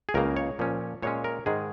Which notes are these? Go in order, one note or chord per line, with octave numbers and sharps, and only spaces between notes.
G#4
C#2 C#3 A#3 A#4
C#5
A#2 F3 C#4
A#2 G#3 C#4 C#5
A#4
G#2 D#3 G#3 G#4